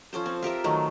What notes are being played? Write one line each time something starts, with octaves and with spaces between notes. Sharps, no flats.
F3 C#4 A4 C5
C4
F4 G4 A#4 E5
D#3 F#3 A3